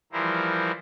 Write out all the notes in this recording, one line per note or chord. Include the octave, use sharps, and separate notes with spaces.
E3 F3 G3 E4 A#4 C5